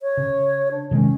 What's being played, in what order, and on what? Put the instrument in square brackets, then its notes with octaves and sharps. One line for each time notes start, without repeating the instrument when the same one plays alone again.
[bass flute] C#5
[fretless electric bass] C#3
[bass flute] D4
[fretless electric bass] C3 D#3 G#3 [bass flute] C#4